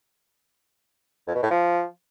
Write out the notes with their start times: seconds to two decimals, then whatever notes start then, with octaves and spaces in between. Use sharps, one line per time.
1.28 F2
1.35 B2
1.43 A2
1.51 F3